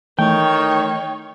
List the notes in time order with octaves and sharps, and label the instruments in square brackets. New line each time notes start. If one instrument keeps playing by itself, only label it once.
[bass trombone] D#3 [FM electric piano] E3 A3 [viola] C#5 [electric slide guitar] G5